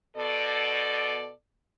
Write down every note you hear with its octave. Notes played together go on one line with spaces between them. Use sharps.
B2 A4 D5